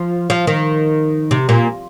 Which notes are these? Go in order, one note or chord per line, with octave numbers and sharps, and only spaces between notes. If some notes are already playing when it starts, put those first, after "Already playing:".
Already playing: F3
F3
D#3
C3
A#2